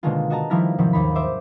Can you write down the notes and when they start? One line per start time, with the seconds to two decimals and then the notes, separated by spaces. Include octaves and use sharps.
0.03 B2 D3 D#3 G#3 A#3 F4
0.30 F#4 D#5 A5 A#5
0.50 D#3 F3 G3 E4 F6 A#6
0.78 G#2 C3 D#3 F3 F#3 E4
0.93 D#2 D#4 B5
1.15 C5 E5 D6